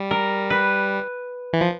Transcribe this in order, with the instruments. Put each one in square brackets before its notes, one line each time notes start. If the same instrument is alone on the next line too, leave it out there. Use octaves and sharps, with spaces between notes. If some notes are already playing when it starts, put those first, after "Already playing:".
Already playing: [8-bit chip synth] G3
[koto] A#4
B4
[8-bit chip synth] E3
F3